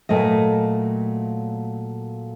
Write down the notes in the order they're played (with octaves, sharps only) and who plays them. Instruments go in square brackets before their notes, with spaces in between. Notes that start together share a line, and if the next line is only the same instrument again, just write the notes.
[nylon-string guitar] A#2 F#3 A3 D#5